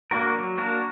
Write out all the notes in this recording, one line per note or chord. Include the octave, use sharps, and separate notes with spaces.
A#3 D4 F#4 A#4
F#3
A#3 D4 F#4 A#4